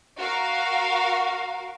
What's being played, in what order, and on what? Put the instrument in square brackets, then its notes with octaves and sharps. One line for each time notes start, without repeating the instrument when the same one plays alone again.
[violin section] F#4 A#4 F5